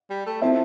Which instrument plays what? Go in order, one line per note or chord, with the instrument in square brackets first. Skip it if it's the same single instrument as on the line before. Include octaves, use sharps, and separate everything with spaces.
[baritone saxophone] G3
A3
[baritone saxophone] F3 [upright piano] C4 E4